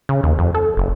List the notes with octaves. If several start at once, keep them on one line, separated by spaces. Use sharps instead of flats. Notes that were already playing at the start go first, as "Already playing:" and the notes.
C#3
D#2
F2
A4
F#1